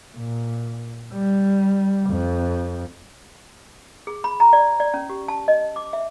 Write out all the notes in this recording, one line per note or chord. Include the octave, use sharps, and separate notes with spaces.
A#2
G3
F2
G#4
B5
A#5
D5
D5
C#4
G4
A5
D#5
D6
E5